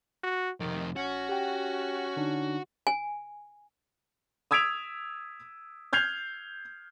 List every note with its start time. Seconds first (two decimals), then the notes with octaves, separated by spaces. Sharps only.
0.24 F#4
0.60 F2 C3 D#3
0.96 A#1 C#4 F#4
1.29 G4 G5
2.16 D3 D4 D#4
2.87 G#5
4.51 D#6 E6 G#6 B6 D7 F7
5.93 F6 G6 G#6 C7 F7